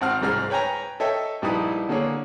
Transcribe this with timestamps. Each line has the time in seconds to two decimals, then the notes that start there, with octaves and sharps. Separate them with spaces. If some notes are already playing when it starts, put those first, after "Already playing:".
0.01 G#1 C4 F#5 F6
0.21 C2 G#2 G#3 F6
0.50 B4 C#5 G5 G#5 A#5
1.00 A4 C#5 D#5 E5 G5
1.42 A#1 G3 D#4 E4 B4 D#6
1.89 D3 A#3 G#4 C#5